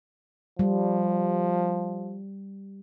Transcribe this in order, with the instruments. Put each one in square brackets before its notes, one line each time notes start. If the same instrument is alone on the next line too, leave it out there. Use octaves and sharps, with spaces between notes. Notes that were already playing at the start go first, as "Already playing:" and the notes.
[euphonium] F3 [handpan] G3